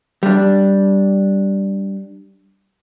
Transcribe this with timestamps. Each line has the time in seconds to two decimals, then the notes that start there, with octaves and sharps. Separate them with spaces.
0.23 G3 D4